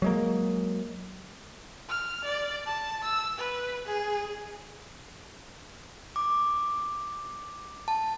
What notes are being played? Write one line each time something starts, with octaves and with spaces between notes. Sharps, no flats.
F#3 G#3 A#3
F6
D5
A5
E6
B4
G#4
D6
A5